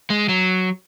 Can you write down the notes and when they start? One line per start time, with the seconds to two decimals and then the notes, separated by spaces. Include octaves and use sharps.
0.10 G#3
0.29 F#3